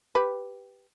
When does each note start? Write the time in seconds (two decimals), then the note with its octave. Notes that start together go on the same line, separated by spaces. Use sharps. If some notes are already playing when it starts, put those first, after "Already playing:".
0.15 G4 B4